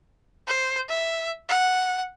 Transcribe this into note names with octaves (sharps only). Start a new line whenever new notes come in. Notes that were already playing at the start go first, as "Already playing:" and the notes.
C5
E5
F#5